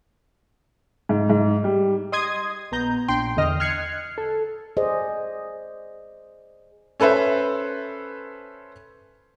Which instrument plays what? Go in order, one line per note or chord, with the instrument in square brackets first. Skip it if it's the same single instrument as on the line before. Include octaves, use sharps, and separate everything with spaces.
[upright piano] G#2
G#2
G3
[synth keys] D#5 C6 D#6 G#6 D#7
A#1 B3 A#5 G6
A#1 D4 G5 C6
E2 D3 D#5 F6
F6 F#6 G#6 C7 C#7
A4
[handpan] G#4 C5 D5 D#5
[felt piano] C#4 A4 B4 C5 E5